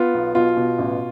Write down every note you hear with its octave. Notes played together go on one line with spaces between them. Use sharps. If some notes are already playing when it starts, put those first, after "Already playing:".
Already playing: B3 F4
B1
B2 F4
B2
A1